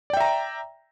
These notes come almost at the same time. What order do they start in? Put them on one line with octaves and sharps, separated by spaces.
D5 G5 E5 A#5